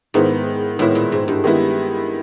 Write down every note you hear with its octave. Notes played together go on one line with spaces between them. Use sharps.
G#2 D#3 G#3 B3 E4
A2 D#3 G#3 B3 E4
A#2
G#2
G2
D#3 G#3 B3 E4